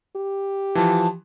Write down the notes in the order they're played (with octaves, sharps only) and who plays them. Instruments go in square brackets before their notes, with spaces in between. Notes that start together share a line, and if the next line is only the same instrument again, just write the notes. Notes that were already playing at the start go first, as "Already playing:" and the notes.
[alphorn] G4
[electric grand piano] E3 F3 [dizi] A5